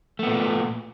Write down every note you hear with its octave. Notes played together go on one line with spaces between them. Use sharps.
A#2 A3 B3